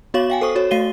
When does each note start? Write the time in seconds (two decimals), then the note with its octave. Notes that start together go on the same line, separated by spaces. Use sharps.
0.14 B3 F#4 C#5 F5 C#6 F#7
0.30 F5 G5 G#5
0.41 A4 C5 C#6 D#6
0.56 F#4 C#5
0.71 A3 F#4 F5 C7 D#7 G7